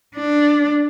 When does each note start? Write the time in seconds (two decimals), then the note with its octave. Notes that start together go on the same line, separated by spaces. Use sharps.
0.16 D4